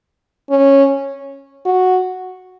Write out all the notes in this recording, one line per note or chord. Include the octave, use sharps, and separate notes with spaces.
C#4
F#4